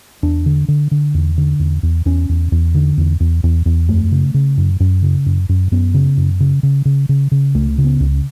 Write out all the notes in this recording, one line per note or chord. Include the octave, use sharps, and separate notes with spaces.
E2 D4
D3
D3
D3
E2
D3
E2
E2
E2 C#4
E2
E2
D3
E2
E2
E2
E2
F#2 A3
C#3
C#3
F#2
F#2
C#3
F#2
F#2
F#2 B3
C#3
F#2
C#3
C#3
C#3
C#3
C#3
C#2 A3
C#3
B3
C#2